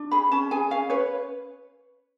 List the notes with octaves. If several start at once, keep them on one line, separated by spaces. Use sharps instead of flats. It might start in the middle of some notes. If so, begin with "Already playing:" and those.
Already playing: D4
G#4 B5
C#4 A5
G#4 G#5
C#4 F5
B4 C#5